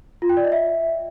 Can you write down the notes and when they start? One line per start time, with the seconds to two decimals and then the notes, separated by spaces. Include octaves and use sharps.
0.22 F4
0.29 G5
0.37 D5
0.44 D#5
0.52 E5